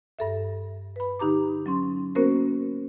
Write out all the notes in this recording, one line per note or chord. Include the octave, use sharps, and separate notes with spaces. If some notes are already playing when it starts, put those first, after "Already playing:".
G2 A4 E5
B4 B5
D3 D#4 G4 A#5 D6
F#3 C#4 C6
A#3 B3 C#4 F#4 A#4 C5